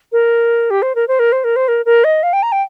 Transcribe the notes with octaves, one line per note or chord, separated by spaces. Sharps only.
A#4
G4
C5
A#4
C5
A#4
C5
A#4
C5
A#4
A#4
D#5
F5
G5
A#5
G5